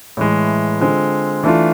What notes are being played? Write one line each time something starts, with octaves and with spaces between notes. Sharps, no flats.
A2 E3 G#3
D3 G#3 C4 F4
E3 A3 D4 F4